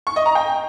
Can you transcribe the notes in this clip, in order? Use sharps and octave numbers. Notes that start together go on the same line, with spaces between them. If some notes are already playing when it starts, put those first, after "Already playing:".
C#6
D#5
A#5
G5